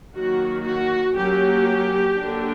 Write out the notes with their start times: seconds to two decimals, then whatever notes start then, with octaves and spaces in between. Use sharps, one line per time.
0.14 D#3 F#3 A#3 F#4
0.66 F#4
1.17 F#3 A#3 C#4 G4
2.19 D3 F#3 A#3 D4